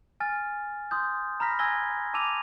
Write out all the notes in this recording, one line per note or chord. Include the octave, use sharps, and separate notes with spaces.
G#5 F6 A6
C6 D#6 G6
A#5 B5 F6 A#6 B6
G#5 A#5 E6 G#6 A#6 G7
A5 D6 E6 D#7 F7